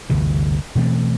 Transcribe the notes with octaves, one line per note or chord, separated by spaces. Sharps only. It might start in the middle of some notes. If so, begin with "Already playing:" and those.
G1 D2 C3 E3
B2 E3 A3 C4